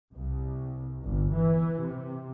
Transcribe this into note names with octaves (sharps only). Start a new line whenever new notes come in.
C2
G1
E3
C3